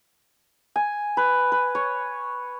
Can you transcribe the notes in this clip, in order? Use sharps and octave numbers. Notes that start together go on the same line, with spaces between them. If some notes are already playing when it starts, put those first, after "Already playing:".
G#5
B4
B4
C#5